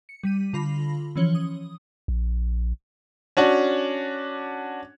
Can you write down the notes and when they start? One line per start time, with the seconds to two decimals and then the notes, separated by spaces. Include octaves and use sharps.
0.09 C#7
0.23 G3 B6 D#7
0.53 D3 F4 B5 A#6
1.15 E3 F3 C#4 C#5 F#7 G7
1.35 D#6
2.08 A#1
3.37 C#4 D4 F#4